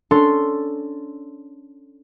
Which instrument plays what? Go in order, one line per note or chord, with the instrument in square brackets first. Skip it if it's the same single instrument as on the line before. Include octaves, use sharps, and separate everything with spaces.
[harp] C#4 D4 A4 C6